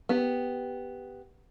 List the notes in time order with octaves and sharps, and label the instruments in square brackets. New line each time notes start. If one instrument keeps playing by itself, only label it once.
[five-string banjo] B3 G4